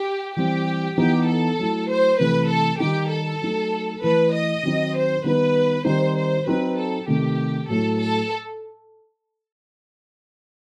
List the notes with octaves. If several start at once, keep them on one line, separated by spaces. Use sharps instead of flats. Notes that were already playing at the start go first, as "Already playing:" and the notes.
Already playing: G4
E3 G3 C4 G4
E3 B3 D#4 G4
A4
F#3 A3 E4
C5
C3 E3 A3 B4
A4
D#3 G3 D#4 G4
A4
F#3 A3 D#4
E3 A3 E4 B4
D#5
D#3 F#3 C4 D#4
C5
D#3 G3 B3 D#4 B4
D#3 G3 C4 D#4 C5
C5
F#3 C4 D#4 B4
A4
C3 D#3 A3 G4
A2 F#3 A3 E4 A4
A4